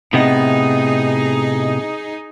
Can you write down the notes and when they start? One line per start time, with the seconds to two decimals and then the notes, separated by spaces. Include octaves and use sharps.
0.13 A2 C3 B3 D#4 G#4